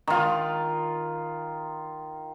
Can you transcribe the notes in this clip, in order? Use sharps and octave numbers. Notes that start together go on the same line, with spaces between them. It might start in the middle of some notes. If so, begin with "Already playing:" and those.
D#3 F4